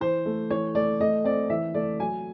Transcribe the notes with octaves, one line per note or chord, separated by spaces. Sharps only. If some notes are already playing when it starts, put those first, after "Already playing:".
E3 C5
A3
E3 C#5
A3 D5
A3 D#5
C4 D5
E3 E5
A3 D5
F#3 G#5